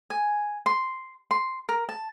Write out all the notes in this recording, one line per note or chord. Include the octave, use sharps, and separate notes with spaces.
G#5
C6
C6
A#4
A5